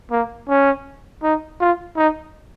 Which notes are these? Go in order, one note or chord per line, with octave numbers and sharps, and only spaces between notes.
A#3
C#4
D#4
F4
D#4